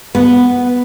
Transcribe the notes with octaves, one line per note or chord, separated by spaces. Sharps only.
B3